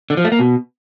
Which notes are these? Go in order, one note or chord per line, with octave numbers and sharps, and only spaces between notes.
D3
F3
A3
A#3
B2